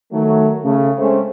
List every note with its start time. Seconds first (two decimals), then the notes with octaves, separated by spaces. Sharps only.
0.12 D#3 F#3 A3
0.64 C#3 A3
0.98 G#3 A3 C4 C#4